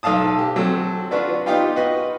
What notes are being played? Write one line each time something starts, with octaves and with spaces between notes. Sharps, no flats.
B1 A4 F5 A5 D#6
G4
F#3 C4 A4
D4 F4 F#4 B4 D5
B3 D#4 F4 G4 F5 G5
F#4 B4 D#5